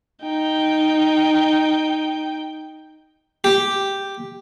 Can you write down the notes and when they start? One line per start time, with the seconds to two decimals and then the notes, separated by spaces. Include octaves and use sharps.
0.23 D#4 G5
3.44 G4